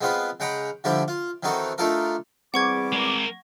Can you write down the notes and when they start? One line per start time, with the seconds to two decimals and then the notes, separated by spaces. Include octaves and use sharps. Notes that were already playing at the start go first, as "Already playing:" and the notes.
0.01 G#3 B3 C4 F4 B4
0.40 C#3 G#3 F#5 G5 A#5 B5
0.84 D3 F3 G3 E4 G4 D5
1.08 F4
1.43 D#3 E3 C4 D#4 F#4 A4
1.78 A3 D4 D#4 F4 A4 A#4
2.54 E2 G3 C4 G#4 F#5 C#6 D6 G#6
2.92 G#3 A#4